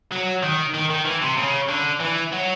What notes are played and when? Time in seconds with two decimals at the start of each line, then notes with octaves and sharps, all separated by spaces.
0.12 F#3
0.43 D#3
0.74 D#3
0.90 D#3
1.06 E3
1.22 C3
1.38 C#3
1.69 D3
2.01 E3
2.33 F#3